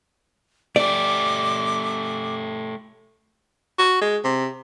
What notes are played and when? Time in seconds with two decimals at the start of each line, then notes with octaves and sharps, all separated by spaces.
0.76 A3 G4 D5 D6
3.79 F#4
4.01 G#3
4.24 C3